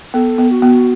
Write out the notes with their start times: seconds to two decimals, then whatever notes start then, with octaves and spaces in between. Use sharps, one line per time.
0.14 B3 A4
0.38 B3
0.51 F#4
0.62 B3